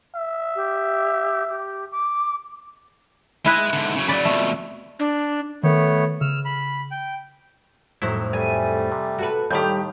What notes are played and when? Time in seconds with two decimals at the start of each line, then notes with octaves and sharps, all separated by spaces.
0.15 E5
0.55 G4
1.50 G4
1.91 D6
3.46 G#3 E4 B4 D#5 G#5
3.73 G#2 D3
3.96 C#3 F#3
4.08 C#3 F#3 D5 B5
4.25 F2 B2 A3
4.99 D4
5.64 D#3 A3 B3 C#5
6.21 C#3 E6 F6
6.45 B5
6.91 G5
8.02 F2 A2 D#3 F#3 E4 C5
8.33 G3 A3 G#5
8.92 C3
9.18 F#4 A4 B4
9.50 D#2 A2 D#3 G3 G4 D5 G6